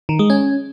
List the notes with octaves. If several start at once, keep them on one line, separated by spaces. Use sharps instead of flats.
D#3
G#3
C#4